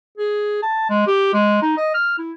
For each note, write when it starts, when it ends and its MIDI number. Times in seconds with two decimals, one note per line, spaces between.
0.18 0.62 68
0.63 0.86 81
0.89 1.05 56
1.07 1.30 67
1.33 1.60 56
1.62 1.73 63
1.77 1.92 75
1.94 2.17 89
2.18 2.32 64